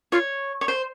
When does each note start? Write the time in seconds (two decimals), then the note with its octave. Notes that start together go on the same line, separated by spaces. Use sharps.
0.12 F4 C#5
0.61 C#5
0.68 C5